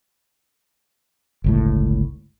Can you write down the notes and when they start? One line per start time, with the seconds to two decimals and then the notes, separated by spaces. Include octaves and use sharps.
1.44 G1 C#2 A2